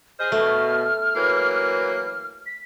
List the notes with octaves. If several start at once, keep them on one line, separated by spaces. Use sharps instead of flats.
G#4 C5 D#5 F6
B2 A3
E3 F#3 A#3
B6